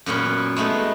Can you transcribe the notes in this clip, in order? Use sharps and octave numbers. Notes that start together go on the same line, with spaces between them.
F#2 A#2 B3 C#4
G#3 A3 B3 D#4